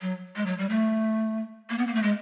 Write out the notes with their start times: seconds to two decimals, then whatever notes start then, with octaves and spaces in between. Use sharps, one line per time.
0.02 F#3
0.36 G#3
0.46 F#3
0.58 G3
0.69 A3
1.70 A#3
1.78 B3
1.87 A#3
1.95 A3
2.03 G#3